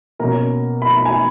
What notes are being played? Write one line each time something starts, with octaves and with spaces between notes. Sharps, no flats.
B2 A#3 C#4 A#4 A#5
B5
A#5
G#5